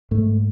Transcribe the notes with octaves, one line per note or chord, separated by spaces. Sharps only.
G#2 A3